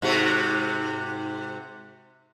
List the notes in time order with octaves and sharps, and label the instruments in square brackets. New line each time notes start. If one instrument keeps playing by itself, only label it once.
[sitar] G#2 C3 F#4